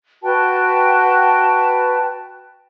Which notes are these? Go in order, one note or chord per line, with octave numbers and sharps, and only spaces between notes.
F#4 B4 G5 A5